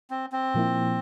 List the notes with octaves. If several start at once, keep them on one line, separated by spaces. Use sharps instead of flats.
C4
C4
A#2 F3 A#3 E4